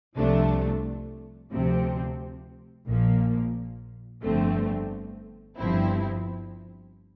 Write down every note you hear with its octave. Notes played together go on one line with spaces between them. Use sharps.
C2 C3 F3 A3 D4
D2 C3 F3 C4
A#1 A#2 F3 A#3
G1 F2 D3 A3 C4
G1 G2 F3 C4 E4